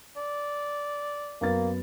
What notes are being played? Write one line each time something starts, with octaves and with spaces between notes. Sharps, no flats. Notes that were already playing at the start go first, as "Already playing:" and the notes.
D5
F#2 A#3 B3 A6